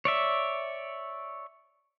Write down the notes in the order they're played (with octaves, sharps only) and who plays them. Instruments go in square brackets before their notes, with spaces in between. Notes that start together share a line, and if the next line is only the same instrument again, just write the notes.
[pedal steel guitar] C#5 D5 E5